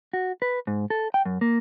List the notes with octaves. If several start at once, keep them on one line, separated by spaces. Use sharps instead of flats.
F#4
B4
G#2
A4
G5
F#2
A#3